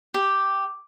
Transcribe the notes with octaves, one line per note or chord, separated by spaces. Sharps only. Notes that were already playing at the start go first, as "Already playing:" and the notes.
G4